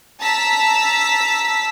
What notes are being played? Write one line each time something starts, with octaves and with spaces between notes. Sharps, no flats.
A5 A#5 E6 B6